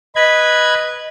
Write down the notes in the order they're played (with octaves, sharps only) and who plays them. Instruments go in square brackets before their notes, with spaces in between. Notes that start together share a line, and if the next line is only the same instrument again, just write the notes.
[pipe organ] B4 B5 G#6 [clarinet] D#5